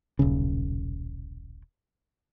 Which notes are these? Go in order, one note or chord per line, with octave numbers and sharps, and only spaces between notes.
D#1 B1 C#3